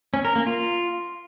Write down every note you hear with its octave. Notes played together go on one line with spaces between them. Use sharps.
C#4
A#4
A#3
F4